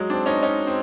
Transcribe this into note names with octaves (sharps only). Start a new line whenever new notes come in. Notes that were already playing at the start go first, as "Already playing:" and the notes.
Already playing: F#3 G#3
C4 D4
C#4 D#4
C#4 D#4
C4